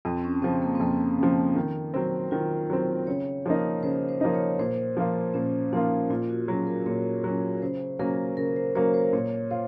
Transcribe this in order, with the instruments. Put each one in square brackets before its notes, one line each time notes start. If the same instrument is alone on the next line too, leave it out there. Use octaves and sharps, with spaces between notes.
[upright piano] F2 [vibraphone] C4
[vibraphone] C#4
[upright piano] C#3 F3 [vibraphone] C4
[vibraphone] A#3
C4
[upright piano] F2 [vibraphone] A#3
[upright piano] C#3 F3
D#3
F#3 C4
[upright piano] D#3 [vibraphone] F4
[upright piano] F#3 C4
[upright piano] C#3 [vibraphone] C#5
[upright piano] F3 A#3 D#4
[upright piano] C#3 [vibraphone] C5
[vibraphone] C5
[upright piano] F3 A#3 D#4
[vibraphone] C#5
[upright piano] A#2 [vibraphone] C5
[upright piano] F3 A#3 F4
[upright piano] A#2 [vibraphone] C#4
[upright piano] F3 A#3 F4 [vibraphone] D#4
[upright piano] A#2 [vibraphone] F4
[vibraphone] F#4
[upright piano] F#3 [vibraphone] G#4
[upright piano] C#4
[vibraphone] A#4
[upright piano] A#2 [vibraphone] C#5
[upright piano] F#3 C#4
[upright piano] C#3 [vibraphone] C5
[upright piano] F#3 A#3 C#4 [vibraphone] A#4
[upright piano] C#3 [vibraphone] A#4
[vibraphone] C5
[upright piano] F#3 A#3 C#4 [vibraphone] C#5
[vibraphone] C5
[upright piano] A#2 [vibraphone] C#5
[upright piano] F4 [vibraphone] C5